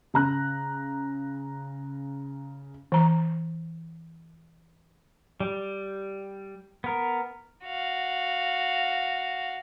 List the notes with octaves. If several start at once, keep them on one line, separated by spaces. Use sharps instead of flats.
C#3 A#5 F#6
E3 A#5
G3
B3 A#4
F#4 F5